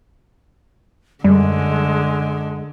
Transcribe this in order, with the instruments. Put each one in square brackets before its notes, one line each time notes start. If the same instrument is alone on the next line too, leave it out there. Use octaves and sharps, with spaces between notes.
[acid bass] F#2 [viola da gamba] D3 [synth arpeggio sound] G3 [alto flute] G#3